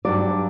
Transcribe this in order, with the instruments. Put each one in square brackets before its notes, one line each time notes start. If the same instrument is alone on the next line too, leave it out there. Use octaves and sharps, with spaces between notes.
[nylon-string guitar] G2 F#3 D5